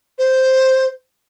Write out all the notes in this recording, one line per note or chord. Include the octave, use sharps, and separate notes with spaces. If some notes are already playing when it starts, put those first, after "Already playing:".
C5